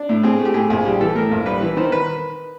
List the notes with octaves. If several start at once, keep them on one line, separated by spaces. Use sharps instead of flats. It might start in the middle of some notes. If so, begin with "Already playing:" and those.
Already playing: D4
A2
C4 G#4
A3
G4
A2 G#4
A#1 G#4
G3 G4
E3 A4
A2 A#4
A#1
G3 B4
E3
D#3 C5
B4